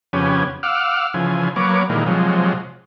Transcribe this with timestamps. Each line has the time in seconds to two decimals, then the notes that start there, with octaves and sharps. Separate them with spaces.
0.13 F2 C#3 B3 C#4 G4 G#5
0.63 F5 F#5 D6 E6 F6
1.14 C#3 E3 F3 G#5
1.56 F#3 A#3 B3 C#5 D6
1.90 A#2 D#3 E3 G3 G#3 A#3
2.06 C3 F3 F#3 G#3